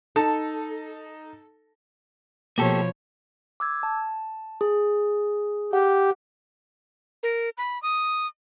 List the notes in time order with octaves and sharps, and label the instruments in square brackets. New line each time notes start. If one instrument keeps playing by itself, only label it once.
[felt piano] D#4 [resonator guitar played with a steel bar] A4
[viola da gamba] B2 F3 C#5 [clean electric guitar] A#3 G4 A4
[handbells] D6 E6 G#6
A5
G#4
[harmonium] G4 [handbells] F#5
[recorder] A#4
B5
D#6